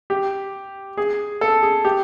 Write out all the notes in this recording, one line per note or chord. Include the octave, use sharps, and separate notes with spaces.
G4
G#4
A4
G#4
G4